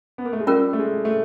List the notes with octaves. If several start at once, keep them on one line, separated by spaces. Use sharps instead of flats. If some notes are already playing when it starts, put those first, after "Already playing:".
B3
A#3
A3
G#3
G3 C#4 F4 A#4
A3
G#3
A3